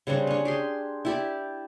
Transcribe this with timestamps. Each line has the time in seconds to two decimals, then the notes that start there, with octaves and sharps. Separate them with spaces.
0.07 C#3 G3 C4 D4
0.27 C#4 D4
0.45 G4 G#4 C6
1.05 E4 G4 D5